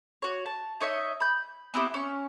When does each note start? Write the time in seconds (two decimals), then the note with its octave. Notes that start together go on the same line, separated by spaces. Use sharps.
0.22 F#4 C#5
0.46 A5
0.81 D#4 C#5 D#5 E5
1.20 B5 G6
1.74 B3 C4 E4 G4
1.94 C#4 C#6